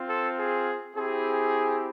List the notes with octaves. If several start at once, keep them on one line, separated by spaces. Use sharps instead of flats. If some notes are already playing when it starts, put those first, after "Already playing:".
Already playing: C4 F4
A4
G#4
C4 E4 G4 G#4